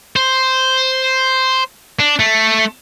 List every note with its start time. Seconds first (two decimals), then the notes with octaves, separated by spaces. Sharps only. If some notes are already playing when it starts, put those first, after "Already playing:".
0.16 C5
1.99 D4
2.20 A3